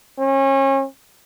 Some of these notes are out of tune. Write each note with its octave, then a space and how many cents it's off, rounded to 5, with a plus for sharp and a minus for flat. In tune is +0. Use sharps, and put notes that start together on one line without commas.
C#4 -35